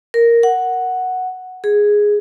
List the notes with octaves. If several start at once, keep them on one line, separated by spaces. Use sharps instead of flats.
A#4
F#5
G#4